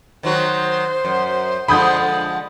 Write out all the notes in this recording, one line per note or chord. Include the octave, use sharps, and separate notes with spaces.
D#3 F#3 F#4 C5
F#2
D3 F3 G#3 B5 D#6 G6